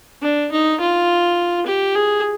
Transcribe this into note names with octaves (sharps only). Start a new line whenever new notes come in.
D4
D#4
F4
G4
G#4